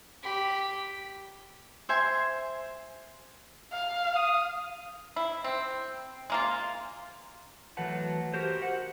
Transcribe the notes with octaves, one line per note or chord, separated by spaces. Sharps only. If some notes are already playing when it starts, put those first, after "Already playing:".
G4 B5
C5 E5 G#5 C6
F5
D#6
E4
C4
G#3 A#3 F4
E3 F#3 A3 B4 F#5 A5
F#4 G4 A#4 C5
F#5